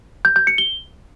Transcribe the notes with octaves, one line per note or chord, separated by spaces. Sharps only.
G6
G6
C#7
G7